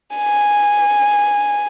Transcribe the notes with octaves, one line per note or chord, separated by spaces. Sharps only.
G#5